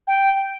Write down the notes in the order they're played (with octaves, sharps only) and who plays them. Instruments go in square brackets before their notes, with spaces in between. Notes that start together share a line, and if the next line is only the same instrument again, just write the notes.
[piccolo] G5